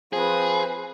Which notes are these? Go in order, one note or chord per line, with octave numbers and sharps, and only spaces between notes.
F3 C4 G#4 B4